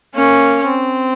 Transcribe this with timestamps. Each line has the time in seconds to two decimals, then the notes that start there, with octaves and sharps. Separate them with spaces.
0.15 A#3 C#4
0.66 C4